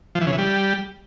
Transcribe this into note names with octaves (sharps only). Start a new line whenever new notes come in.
F3
E3
C#3
E3
G3